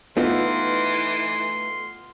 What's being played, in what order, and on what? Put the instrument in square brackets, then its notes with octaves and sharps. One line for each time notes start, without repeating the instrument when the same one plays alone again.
[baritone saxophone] E3 [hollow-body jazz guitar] A3 D#4 [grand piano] B3 F4 [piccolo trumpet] C6